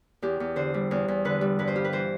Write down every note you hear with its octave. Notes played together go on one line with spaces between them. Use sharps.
E2 G4
E2
D3 C5
G3
E2
E2
D3 B4
G3
G2 B4
C5
F4 G4
B4
E3 C5